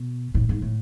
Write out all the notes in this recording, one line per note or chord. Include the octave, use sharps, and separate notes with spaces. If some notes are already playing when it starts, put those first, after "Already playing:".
Already playing: B2
A2
G#2
A2